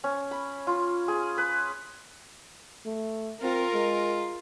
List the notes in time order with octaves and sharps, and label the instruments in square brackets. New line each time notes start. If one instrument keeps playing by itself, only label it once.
[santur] C#4
B5
F4
G#4
B4
[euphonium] A3
[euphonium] C4 [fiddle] F4 [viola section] A#4
[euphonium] G#3